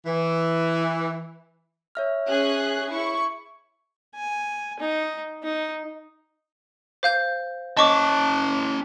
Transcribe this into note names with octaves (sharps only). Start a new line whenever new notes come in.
E3
C#5 E5 F6
C#4 G#4 F#6
E4 C#6
G#5
D#4
D#4
C5 F5 G6
C#4 D#5 A5 C#6 D6